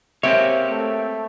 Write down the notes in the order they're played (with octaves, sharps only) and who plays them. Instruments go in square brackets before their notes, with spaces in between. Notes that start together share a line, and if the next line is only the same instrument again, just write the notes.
[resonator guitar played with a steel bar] G#3 A#3 E5 [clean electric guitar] C4 G4 C#5
[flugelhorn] A3